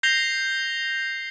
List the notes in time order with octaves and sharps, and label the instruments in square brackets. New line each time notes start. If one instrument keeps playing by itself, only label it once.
[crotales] G6 A#6 C7 F7 G7